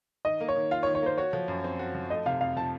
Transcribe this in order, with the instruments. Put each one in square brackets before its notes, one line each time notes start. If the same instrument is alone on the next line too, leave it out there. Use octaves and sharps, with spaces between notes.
[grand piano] D#3 [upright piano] D#5
[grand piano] A#3
[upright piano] C#5
[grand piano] D#3
[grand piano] F4 [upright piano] F5
[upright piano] C#5
[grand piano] D#3
[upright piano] C#5
[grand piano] A#3 [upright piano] C5
[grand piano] F#4 [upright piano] C#5
[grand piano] F3
F#2
C4
F#4
F3
[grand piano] A3 [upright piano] D#5
[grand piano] C3 [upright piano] F5
[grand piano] F2 [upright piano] F5
[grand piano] F3 [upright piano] A5